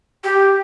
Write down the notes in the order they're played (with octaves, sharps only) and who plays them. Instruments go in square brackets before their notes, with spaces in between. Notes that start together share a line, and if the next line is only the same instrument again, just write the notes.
[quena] G4